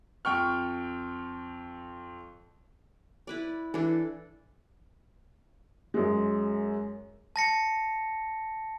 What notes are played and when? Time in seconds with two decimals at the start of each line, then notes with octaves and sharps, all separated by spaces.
0.25 F2 G5 C#6 F6
3.27 E4 B4 D5
3.74 E3 D4 A4
5.94 F#2 G#3
7.36 A5 A#6 C#7